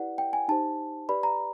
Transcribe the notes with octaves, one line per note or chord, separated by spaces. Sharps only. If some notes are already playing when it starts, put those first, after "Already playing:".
Already playing: E4 G4 B4 D5 F#5
G5
G#5
D#4 G4 C5 A5
G4 B4 D5 B5
A#5